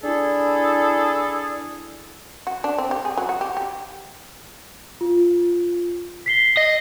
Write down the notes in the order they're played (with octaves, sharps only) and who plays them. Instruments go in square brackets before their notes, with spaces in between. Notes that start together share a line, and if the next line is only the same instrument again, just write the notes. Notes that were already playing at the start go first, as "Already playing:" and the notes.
[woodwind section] D4 E4 G#4 A4
[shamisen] F#4
D4
C4
G4
G#4
F#3
F#4
G4
G4
[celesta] F4
B6 C7 G7
[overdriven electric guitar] D#5